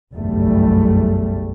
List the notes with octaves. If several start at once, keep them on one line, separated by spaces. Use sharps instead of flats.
F#1 B1 E2 G2 G3 A3